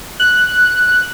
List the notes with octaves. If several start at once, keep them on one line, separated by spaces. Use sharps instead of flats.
F#6